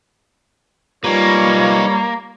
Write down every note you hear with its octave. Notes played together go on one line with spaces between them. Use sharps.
G3 A#3 D#4 F4 B4 C#5